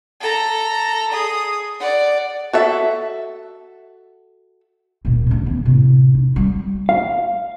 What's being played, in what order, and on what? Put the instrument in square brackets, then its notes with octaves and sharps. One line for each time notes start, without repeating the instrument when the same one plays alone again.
[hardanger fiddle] A4 A#5
G#4 D#6
D5 F#5
[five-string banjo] F#4 A4 E5
[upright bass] D1 A#2
D2 D3
E3 B3
A2 C3
D#4
G3
[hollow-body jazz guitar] F5